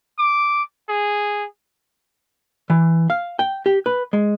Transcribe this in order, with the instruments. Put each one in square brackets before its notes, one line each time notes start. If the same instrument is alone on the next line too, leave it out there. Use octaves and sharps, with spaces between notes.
[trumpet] D6
G#4
[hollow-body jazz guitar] E3
F5
G5
G4
B4
G#3